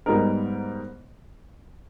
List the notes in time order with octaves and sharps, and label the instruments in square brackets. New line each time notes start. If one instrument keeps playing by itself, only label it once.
[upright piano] G#2 G3 B3 D#4 A#4